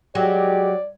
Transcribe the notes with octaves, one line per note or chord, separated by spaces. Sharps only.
F#3 G#3 G4 D5